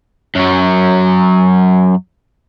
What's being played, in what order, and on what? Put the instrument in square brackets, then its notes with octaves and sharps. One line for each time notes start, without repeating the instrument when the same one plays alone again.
[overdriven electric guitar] F#2 F#3